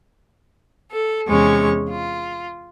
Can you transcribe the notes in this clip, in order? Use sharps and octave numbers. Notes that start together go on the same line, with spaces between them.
A4
E2 C3 G#3 C#4 C#6
F4